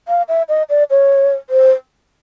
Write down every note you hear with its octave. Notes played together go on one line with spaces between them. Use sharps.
F5
E5
D#5
D5
C#5
C5